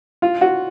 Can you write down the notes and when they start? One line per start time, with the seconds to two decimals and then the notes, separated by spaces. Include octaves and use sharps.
0.22 F4
0.41 F#4